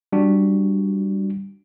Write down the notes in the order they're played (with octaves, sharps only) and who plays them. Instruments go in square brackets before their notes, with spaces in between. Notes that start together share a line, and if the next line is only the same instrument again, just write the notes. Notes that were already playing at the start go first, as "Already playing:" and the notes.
[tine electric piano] G3 D4 F#4